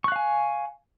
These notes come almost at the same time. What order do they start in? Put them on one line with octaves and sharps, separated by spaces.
C#6 F#6 F5 G#5